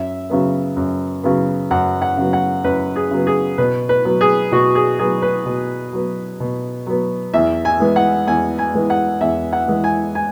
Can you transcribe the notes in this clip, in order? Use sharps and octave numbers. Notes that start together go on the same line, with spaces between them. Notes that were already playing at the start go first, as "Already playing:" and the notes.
Already playing: F#2 E5
C#3 F#3 B3
F#2
C#3 F#3 B3
F#2 F#5
F#5
C#3 F#3 B3
F#5
F#2 B4
G#4
C#3 F#3 B3
G#4
B2 B4
B4
F#3 B3
G#4
B2 F#4
G#4
F#3 B3 G#4
B4
B2
F#3 B3
B2
F#3 B3
E2 E5
G#5
E3 G#3 B3
F#5
E2 G#5
G#5
E3 G#3 B3
F#5
E2 E5
F#5
E3 G#3 B3
G#5
G#5